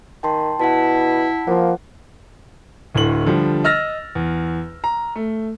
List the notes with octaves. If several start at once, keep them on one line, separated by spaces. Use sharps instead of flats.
D#3 G5 A5 C6
B2 E4 F#5 A5
F3 A#3 F#5
D1 A2 D3 F#7
D3 F3 G3
D#5 E6 F6 A6 A#6
E2
A#5
A3